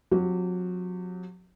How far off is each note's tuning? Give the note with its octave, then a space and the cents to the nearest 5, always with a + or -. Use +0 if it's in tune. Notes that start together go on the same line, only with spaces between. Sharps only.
F#3 -35 C4 +0 G4 -30